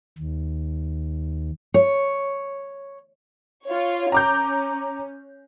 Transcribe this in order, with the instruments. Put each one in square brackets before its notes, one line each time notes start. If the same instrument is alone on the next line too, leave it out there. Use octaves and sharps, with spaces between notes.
[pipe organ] D#2
[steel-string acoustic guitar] C#5
[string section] F4 C#5
[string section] C#4 [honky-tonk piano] A#5 D6 G6